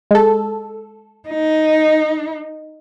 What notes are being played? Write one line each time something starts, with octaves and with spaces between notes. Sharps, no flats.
G#3 A4
D#4